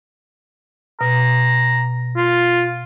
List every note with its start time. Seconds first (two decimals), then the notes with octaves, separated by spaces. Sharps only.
1.01 B2 A#5
2.16 F4